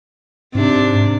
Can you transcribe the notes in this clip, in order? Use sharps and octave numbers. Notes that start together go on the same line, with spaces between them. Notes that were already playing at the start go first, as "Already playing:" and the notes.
G#2 C3 D4